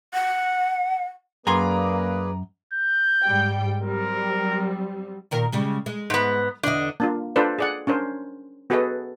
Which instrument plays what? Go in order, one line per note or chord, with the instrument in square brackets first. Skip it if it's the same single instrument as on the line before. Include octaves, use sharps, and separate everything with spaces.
[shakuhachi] F#5
[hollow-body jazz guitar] F#2 G#5 C6 [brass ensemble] A#3 [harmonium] G#4 B4 D5 [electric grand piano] A#5
[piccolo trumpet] G6
[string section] G#2 G3 G5
[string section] F#3 G3 C4 [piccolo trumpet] A#4
[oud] A#2 D#3 A#4
C#3 G3 G#3
G#3
[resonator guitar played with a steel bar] G#2 B3
[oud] E2 D3 [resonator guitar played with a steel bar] D4 D#5
[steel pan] A#3 D4 F4
D4 F4 A4 B4 C5 D5
G#4 D5 F#5
C#4 D4 A#4 C5
B3 F#4 G#4 A4 B4 D#5